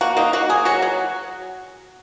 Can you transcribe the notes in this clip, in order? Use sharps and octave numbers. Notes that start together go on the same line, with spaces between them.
A#3 F#4
A#3 D#4
A#3 F#4
A#3 G#4
F#3 F#4
F#3